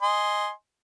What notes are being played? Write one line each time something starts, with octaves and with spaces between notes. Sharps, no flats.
D#5 G#5 C6